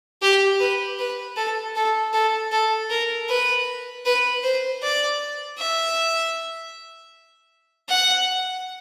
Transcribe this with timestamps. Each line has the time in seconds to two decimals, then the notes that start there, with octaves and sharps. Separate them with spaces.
0.22 G4
0.60 B4
0.99 B4
1.37 A4
1.75 A4
2.13 A4
2.52 A4
2.90 A#4
3.29 B4
4.05 B4
4.43 C5
4.82 D5
5.58 E5
7.89 F#5